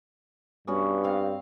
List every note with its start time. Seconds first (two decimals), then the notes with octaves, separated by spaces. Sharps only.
0.67 G2 B3 C#4 F#4
1.04 C4 F5